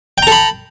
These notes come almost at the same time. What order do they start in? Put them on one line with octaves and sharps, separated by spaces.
G5 A#5 A4 B5